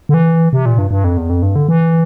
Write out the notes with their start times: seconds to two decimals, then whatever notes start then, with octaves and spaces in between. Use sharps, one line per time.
0.09 D3
0.14 E3
0.53 C3
0.66 A#2
0.78 G2
0.91 G2
1.04 F2
1.17 E2
1.30 F2
1.42 G2
1.56 D3
1.69 E3